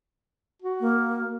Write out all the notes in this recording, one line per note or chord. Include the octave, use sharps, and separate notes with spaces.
F#4
A#3